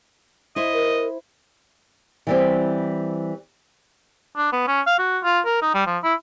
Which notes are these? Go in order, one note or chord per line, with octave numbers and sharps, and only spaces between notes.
E4 C5 D#5
A#4
E3 G3 C4
D4
B3
C#4
F5
F#4
F4
A#4
D#4
G3
F3
E4